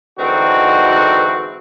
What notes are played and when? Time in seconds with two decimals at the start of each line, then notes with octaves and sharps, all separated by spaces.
0.19 G#2 D3 E3 C4 D#4 F#4